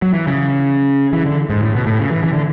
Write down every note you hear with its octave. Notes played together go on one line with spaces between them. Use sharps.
F#3
E3
C#3
E3
D3
G#2
A2
B2
A2
C#3
E3
E3
D3